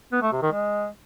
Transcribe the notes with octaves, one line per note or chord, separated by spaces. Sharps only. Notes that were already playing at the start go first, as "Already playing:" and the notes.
B3
A3
C3
D#3
G#3